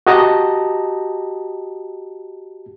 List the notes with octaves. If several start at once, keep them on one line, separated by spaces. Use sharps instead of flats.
F#4 G4 D#5 G5 A5 A#5